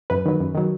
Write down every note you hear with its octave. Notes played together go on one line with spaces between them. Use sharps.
F#2 B4
D#3 F#3
F#2
D#3 F#3